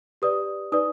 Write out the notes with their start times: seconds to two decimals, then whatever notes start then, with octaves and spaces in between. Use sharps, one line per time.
0.22 G4 B4 D5 D#6
0.72 D#4 B4 D5 D#6